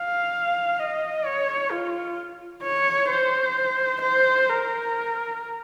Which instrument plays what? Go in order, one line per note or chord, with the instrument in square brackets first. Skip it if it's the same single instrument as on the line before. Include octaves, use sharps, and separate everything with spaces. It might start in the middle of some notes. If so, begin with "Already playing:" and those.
Already playing: [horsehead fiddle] F5
D#5
C#5
F4
C#5
C5
C5
A#4